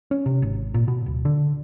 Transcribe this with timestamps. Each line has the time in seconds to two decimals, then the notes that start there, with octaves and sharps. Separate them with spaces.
0.11 C#4
0.26 C3
0.42 G#1
0.74 A#2
0.88 B2
1.06 D1
1.25 D3